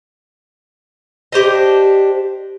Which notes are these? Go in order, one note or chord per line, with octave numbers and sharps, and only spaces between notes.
D4 G4 C5 D#5